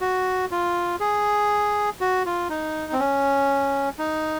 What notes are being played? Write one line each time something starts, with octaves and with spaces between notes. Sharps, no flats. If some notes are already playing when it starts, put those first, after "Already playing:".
F#4
F4
G#4
F#4
F4
D#4
C4
C#4
D#4